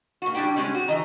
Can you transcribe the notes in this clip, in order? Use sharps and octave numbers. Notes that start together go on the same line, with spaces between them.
A#2 F#4
G3 D4 E4 G4 G5
G3 G#3 C#4 G4
F#4
E3 D#5 A#5